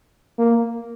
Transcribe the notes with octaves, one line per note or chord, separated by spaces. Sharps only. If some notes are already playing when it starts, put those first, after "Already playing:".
A#3